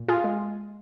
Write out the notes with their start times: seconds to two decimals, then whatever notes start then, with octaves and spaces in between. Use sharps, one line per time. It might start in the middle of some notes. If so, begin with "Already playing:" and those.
Already playing: A#2
0.08 F4 G#4
0.24 G#3